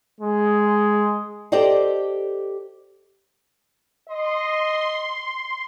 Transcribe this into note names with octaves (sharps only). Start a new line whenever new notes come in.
G#3
G4 A4 C5 D5 D#5 G5
D#5 C6